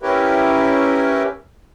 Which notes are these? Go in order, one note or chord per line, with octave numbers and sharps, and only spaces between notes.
C#4 E4 G4 A#4 B4